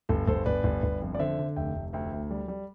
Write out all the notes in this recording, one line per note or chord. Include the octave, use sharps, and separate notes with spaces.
G1 A4
G1 A4 C5
G1 B4 D5
G1
G1
F2
D5
D3 C5 E5
D3
F1 E5 G5
F1
D2 E5 G5
D2
G3
G3